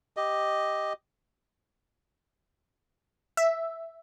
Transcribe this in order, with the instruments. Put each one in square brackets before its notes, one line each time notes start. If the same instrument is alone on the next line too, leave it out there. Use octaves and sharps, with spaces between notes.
[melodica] G4 D#5
[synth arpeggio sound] E5